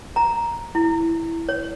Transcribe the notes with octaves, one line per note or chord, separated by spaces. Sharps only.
A#5
E4
C#5